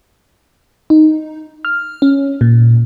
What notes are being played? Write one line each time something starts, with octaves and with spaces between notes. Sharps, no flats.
D#4
F6
C#4
A#2